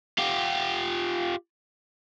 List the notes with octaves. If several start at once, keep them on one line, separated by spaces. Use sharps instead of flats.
F4 G4